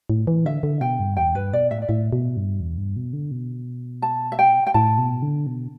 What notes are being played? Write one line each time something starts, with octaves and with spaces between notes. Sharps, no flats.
A2
E3
D3 E5
D3
B2 G5
G2
E2 G5
G2 B4
B2 D5
A2 E5
D5
A2 E5
B2
G2
E2
G2
B2
D3
B2
A5
E5
G5
G5
A2 A5
B2
D3
B2